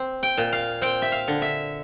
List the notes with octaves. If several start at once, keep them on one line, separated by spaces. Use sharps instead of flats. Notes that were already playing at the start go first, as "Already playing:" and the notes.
Already playing: C4
G5
A#2
F5
C4 G5
E5
F5
D3
E5